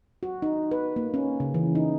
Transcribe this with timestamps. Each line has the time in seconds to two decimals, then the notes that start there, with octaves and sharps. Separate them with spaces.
0.23 F#4
0.42 D#4
0.71 B4
0.96 A#3
1.14 C#4
1.40 C#3
1.54 E3
1.75 D#4